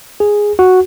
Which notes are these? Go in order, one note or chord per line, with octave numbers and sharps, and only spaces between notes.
G#4
F#4